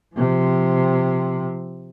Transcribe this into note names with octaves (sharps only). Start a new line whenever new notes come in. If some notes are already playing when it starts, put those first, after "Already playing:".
C3 F3